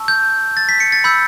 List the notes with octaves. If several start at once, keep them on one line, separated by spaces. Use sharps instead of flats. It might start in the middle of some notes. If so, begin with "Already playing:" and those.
Already playing: A5 C#6 E6
G6
A6
B6
C#7
A6
B5 E6 G6